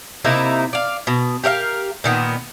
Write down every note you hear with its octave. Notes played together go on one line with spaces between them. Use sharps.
C3 A#3 D#4 E4
D5 F5
B2
G4 A#4 E5 F5
A#2 D#3 B3